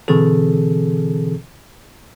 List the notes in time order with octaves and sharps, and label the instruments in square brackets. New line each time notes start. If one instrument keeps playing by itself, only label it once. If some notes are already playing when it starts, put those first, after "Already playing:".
[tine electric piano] B2 D3 E3 C4 G#4 A4